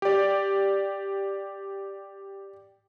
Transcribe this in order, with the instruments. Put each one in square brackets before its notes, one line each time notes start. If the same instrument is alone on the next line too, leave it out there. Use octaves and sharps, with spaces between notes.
[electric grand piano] G4 D5